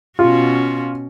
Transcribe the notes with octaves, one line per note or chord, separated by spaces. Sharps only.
B2 C#4 F4 F#4